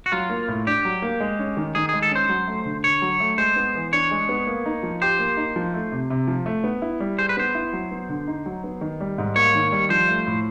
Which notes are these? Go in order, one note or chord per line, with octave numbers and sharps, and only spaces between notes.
F#4
F#3 F4
A#3
A2
D4 G4
F#3
A#3
G#3
C#4
D#3
D#3 G#4
G#3 G#4
A4
C#4 C5
F#3
A3
D3
D3 C#5
F#3
A3
G#3 C5
B3
E3
D4 C#5
G#3
B3
A#3
D#4
F3
G4 C5
A#3
D#4
F3
A3
C3
C3
F3
A3
B3
E4
G3
G#4 C5
B4
B3 C5
E4
F#3
B3
D3
D#4
F#3
B3
D#3
G3
G#2
A#3 C#5
D#3
G3
F3 C5
A3
A2